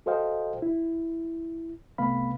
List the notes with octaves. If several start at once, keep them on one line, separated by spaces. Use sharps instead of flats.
F#4 A4 C5 D#5 F5 G5
E4
C2 C3 A3 B3 F5 B5